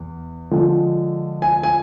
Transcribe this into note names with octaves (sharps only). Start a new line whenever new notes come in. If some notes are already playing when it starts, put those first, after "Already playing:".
Already playing: E2
D3 F3 G#3
G#5
G#5